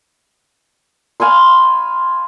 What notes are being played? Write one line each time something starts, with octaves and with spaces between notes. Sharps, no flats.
F5 G#5 B5 C6